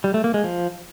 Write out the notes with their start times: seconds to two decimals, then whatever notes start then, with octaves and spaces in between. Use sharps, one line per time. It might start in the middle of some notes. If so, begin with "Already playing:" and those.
0.04 G3
0.14 A3
0.24 A#3
0.34 G#3
0.44 F3